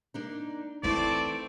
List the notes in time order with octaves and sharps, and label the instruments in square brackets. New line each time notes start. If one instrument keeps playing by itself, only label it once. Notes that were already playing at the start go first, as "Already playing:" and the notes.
[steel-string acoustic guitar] A#3 D4 D#4
[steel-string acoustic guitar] E3 A4 [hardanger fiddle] A3 C4 [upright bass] D#4 E4 [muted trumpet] D5